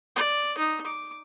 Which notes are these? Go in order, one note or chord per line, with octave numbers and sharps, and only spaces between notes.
D5
D#4
D6